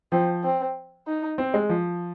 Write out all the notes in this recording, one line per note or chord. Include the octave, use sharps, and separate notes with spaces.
F3 C4
C4
D#4
C4
G#3
F3